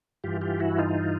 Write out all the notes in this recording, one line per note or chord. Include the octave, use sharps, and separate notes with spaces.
G2 E3 F4 G4
F4 G4
E4 F#4
D#4 F4